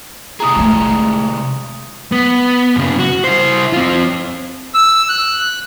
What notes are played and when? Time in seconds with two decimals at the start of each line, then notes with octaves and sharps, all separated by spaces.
0.40 C3 E4 G#4 A#5 D#6
0.56 G#3 A3
2.12 B3
2.76 F#2 C#3
2.99 F#4
3.24 E4 C5
3.73 C4 F4
4.74 E6
5.09 F#6